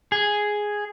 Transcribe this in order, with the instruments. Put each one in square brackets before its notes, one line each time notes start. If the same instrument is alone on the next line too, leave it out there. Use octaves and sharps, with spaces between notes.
[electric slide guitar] G#4